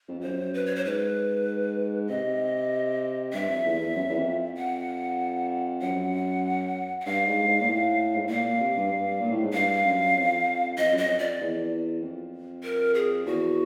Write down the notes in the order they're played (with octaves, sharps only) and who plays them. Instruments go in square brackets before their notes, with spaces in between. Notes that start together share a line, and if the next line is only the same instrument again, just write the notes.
[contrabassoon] F2
F2
[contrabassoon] F#2 [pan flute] C5
[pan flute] B4
C#5
C5
[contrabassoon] G#2 [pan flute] B4
[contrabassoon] C3 [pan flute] D#5
[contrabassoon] G2 [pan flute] E5
[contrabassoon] F2
E2
E2
F#2
F2
E2
F2
[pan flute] F#5
[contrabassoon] F#2 [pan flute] F#5
[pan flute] F#5
[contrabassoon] G2 [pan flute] F5
[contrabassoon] G#2
G#2
A#2
A2
G#2
A2
[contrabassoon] A#2 [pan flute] F5
[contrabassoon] A#2
C3
G2
G2
A#2
A2
G#2
[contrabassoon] G2 [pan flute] F5
[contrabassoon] F#2
F2
[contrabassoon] F2 [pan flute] D#5
[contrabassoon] F#2
[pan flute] D#5
[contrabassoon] F2
[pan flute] D5
[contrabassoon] E2
F2
[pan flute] A#4
G#4
[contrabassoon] E2 [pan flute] F#4